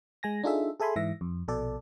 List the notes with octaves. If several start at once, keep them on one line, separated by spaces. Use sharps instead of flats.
G#3 G#5 A#6
D4 D#4 F4 G#4 A4 E5
G#4 A4 E5 G#5 B5 C6
G#2 E3 E5 A#6
F2
A#1 B2 A4 D5